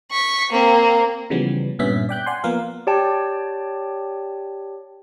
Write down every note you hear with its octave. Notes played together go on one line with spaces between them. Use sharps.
C#6 B6
A#3 C4
C#3 E3 F3 G3 B3 C#4
G2 A#2 B3 C#4 E5 B6
D5 G5 F#6 G6
D5 F#5 G#5 C6
F3 A#3 B3 A#4 F5
G4 C#5 D5 G5 A5